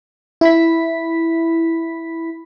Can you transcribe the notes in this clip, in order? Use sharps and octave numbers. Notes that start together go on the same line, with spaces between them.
E4 B5 B6